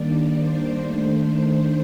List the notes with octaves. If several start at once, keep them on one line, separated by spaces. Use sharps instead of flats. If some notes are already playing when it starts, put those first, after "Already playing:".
Already playing: D#3 G3 A#3 D4 D5
C5
D#3 A3 D4 C5